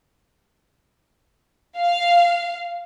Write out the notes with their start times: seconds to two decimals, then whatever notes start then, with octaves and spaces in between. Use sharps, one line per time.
1.78 F5